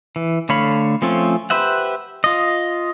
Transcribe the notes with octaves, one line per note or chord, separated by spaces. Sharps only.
E3
D3 A3 C#5 F5 B5
F3 A3 C4 C#4 F4
G4 B4 C5 E5 F#5
F4 D#5